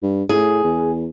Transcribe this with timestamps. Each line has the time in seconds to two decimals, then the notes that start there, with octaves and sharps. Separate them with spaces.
0.03 G2
0.29 A2 G#4
0.64 E2